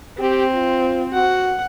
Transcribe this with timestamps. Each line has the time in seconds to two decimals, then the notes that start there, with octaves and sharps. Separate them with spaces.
0.19 C4 G4
0.53 F4
1.13 F#4 F#5